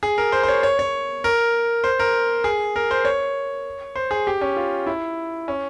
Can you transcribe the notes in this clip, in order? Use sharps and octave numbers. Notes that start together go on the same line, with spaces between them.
G#4
A#4
C5
C5
C#5
C#5
C#5
A#4
C5
A#4
G#4
A#4
C5
C#5
C5
G#4
G4
C#4
F4
E4
C#4